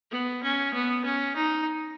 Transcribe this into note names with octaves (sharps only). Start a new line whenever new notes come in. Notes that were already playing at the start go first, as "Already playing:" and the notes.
B3
C#4
B3
C#4
D#4